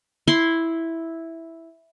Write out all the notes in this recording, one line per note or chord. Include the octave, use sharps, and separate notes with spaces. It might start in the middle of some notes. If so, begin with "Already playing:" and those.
E4 C6